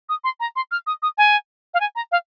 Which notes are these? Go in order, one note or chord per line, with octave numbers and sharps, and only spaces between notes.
D#6
C6
A#5
C6
F6
D#6
D#6
G#5
F5
G#5
A#5
F5